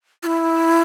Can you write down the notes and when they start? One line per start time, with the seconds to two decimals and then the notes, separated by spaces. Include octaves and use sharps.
0.23 F4
0.27 E4